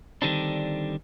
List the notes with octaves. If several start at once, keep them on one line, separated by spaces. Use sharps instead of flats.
D3 D#3 G3 C4 D4